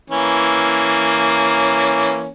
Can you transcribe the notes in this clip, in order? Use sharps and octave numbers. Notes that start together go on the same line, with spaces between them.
E3 A#3 C#4